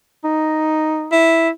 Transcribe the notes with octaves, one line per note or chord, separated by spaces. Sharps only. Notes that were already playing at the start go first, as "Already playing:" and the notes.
D#4
E4